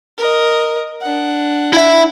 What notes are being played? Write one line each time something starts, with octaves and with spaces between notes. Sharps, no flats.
A#4 D#5
D4 F#5
E4 E5